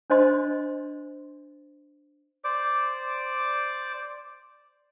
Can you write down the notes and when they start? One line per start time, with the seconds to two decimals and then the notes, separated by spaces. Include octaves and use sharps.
0.10 D4 C5 D#5 C6
2.44 C5 D5 D6